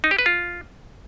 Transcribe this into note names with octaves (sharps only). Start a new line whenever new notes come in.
D#4
G4
B4
F4